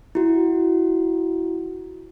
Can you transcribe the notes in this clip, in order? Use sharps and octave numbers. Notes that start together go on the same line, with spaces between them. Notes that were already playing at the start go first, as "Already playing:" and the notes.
E4 F#4